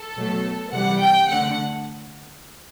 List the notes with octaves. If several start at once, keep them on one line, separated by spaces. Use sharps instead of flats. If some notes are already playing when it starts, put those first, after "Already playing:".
Already playing: A4
B2 F#3 A3
C3 E3 G3 F#5
G5
D3 A3 F#5